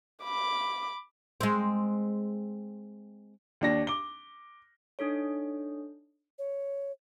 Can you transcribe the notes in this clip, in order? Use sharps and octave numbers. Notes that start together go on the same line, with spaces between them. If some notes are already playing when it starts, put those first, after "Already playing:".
B5 D6
G#3 C4
D#2 D4 A#6
D6 G7
D4 D#4 A4 C#5
C#5